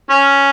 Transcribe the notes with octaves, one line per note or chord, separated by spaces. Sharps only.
C#4